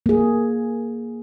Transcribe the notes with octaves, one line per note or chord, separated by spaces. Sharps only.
A#3 G#4